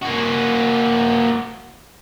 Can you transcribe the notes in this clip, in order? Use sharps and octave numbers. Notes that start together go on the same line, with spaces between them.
A#3 F#4